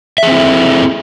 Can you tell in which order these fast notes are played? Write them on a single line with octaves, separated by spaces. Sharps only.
E5 G#4 C4 E4 A4